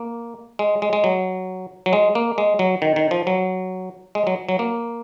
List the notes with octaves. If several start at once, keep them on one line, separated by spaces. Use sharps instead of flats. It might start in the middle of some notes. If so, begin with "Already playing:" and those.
Already playing: A#3
G#3
G#3
G#3
F#3
F#3
G#3
A#3
G#3
F#3
D#3
D#3
F3
F#3
G#3
F#3
F#3
A#3